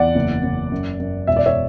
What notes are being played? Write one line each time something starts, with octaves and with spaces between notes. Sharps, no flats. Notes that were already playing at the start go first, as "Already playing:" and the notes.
Already playing: E2 D5 F#5
F#1
F#1
F#2
F#2
E1 E5
D5
C#5 E5